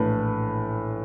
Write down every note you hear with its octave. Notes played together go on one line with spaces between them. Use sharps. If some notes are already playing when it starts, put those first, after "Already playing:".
Already playing: A#1 A2 E3 A3 B4